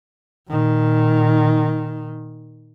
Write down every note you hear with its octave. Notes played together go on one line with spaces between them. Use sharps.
A#2 D#3